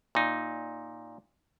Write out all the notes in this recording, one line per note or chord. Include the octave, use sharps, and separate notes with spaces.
A#2 D#4